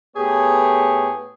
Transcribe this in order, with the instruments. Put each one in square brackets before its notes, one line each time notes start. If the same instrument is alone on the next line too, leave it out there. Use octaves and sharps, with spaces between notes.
[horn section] A2 B3 G4 G#4 C#5